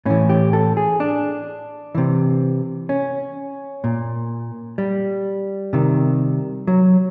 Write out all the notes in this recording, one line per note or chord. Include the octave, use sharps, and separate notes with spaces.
A2 E3 C#4
G4
A4
G#4
D4
C3 E3
C#4
A#2
G3
C3 D#3
F#3